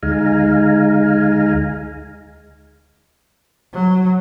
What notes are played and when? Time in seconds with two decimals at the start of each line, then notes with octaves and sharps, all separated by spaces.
0.03 D2 G#3 D#4 F5 G#5 A#5
3.73 F#3